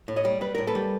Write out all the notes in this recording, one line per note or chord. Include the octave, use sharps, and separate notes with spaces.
A2
C#5 D#5
G3
G3 B4
A2 A#4
A4 B4
G3